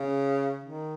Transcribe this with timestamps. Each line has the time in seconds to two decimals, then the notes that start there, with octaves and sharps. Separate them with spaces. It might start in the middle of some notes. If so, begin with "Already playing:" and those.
Already playing: C#3
0.64 D#3